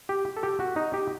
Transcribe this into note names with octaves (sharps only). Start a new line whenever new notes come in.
G4
A4
G4
F#4
D#4
G4